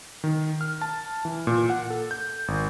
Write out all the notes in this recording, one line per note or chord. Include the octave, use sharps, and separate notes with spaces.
D#3
F6
A5
E3
A#2
F#5
A4
G6
G#1